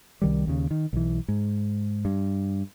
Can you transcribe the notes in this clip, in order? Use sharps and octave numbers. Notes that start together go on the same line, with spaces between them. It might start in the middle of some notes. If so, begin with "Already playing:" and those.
C2 D#3 G3
D#2 C#3
D#3
B1 E3
G#2
G2